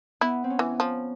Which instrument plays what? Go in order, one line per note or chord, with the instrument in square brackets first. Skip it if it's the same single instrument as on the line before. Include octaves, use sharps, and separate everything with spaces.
[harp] B3 [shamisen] E4
[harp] C4
C#4
[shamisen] E3
F3